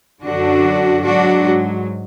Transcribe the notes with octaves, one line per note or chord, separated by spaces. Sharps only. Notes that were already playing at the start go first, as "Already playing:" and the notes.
F#2 D3 F#3 D4 F#4
G#2 F#3 D4 F#4